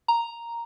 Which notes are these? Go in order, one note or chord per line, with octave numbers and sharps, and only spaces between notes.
A#5